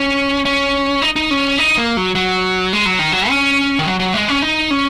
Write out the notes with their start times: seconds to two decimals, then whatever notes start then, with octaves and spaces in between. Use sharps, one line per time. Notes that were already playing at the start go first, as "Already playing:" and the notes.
Already playing: C#4
0.45 C#4
1.02 D#4
1.16 D#4
1.31 C#4
1.58 D#4
1.78 A#3
1.97 F#3
2.15 F#3
2.73 G#3
2.86 F#3
2.99 D#3
3.12 F#3
3.29 C#4
3.79 D#3
3.86 F#3
4.00 F#3
4.14 G#3
4.28 C#4
4.42 D#4
4.71 C#4